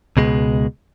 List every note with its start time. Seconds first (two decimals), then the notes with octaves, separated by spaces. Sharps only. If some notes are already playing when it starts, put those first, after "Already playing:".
0.17 C#2 B2 G#3